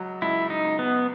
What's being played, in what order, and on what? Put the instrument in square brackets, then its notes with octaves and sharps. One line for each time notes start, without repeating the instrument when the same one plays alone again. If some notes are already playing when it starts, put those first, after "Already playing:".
Already playing: [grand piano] C#2 F#3
[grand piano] C#2 [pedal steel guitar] E4
[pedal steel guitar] D#4
[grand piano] C#2
[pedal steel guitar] B3